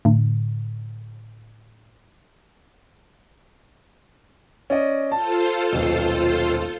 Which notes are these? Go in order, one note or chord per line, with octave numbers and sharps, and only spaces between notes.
A2 D3
C#4 D5 D#5
F4 A4 C5 A5
D#1 B1